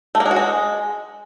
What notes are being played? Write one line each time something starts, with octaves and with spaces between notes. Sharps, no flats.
A3
A#3
G#3
F#4
G#3